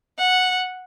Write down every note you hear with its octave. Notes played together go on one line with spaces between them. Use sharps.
F#5